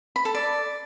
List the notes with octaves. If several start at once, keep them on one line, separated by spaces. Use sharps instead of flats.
B5
A4
D5